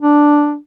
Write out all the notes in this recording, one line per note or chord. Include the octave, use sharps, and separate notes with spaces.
D4